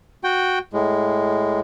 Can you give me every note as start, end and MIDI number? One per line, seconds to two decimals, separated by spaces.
0.24 0.59 66
0.24 0.59 79
0.73 1.60 45
0.73 1.60 56